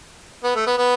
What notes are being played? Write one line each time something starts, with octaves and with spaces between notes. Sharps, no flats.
B3
A3
B3
B3